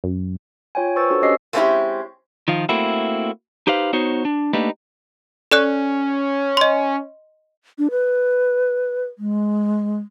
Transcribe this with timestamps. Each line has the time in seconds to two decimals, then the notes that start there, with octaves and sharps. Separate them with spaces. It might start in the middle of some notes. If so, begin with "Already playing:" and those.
0.04 F#2
0.75 F4 C#5 G5 G#5
0.96 B4 C5 C#6 E6 A6
1.09 D4 F#4 A4 C5 C#5
1.22 C#4 G4 C#5 D#5 E6 C7
1.53 G#3 A3 C4 C#4 E4 G4
2.48 D#3 F3 F4
2.69 A3 A#3 C4 E4 F#4
3.67 D#4 G4 B4 C5 F5
3.93 B3 D#4 F#4 C5 C#5
4.25 D4
4.53 A3 A#3 D4 D#4 G4 B4
5.52 C#4 A4 D5 F#6
6.57 D#5 C6
7.78 D4
7.91 B4
9.18 G#3